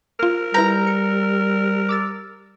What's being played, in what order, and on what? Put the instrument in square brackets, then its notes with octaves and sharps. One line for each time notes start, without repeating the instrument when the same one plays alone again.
[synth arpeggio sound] F4 F6 [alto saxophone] A#4
[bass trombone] G3 [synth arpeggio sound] E4 B4 G6 [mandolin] A#5
[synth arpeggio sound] C#7
D6 E6 A6